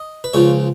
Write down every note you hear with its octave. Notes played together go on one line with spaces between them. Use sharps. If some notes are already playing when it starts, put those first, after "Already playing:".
Already playing: D#5
B4
C#2 C#3 F3 C#5